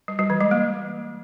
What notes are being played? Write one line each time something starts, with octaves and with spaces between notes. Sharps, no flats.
G3
G3
E3
G#3
A#3